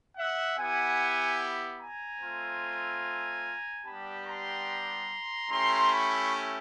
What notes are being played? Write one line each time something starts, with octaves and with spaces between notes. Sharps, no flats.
E5 F#5
B3 E4 G4 F#5 G#5
G#5 A#5
A3 C4 F4
G3 B3 D4 G4 A5 B5
A#5 C6
A3 C#4 E4 G4 A#5 C6
B5 C#6